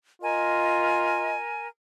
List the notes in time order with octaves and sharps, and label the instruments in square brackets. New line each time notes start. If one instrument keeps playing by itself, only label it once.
[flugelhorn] F4 [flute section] A#4 G#5 [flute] D#5